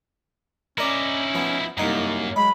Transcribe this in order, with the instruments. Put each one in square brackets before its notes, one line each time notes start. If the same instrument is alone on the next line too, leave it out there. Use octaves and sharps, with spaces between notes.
[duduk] C#4 [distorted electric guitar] D#4 E4 [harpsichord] A#4 D5
[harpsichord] F3 B3
[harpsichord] C2 D#4 A#5 [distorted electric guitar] F#2 [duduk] A#3
[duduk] F#3 [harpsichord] G#3 [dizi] B5